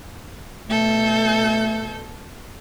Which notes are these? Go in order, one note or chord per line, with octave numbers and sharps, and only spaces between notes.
B2 A3 A4 G6